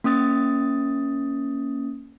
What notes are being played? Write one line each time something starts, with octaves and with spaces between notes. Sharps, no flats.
A#3 C#4 D#6 A6